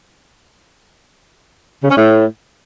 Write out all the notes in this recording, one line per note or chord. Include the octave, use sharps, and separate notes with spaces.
C#3
C#4
A2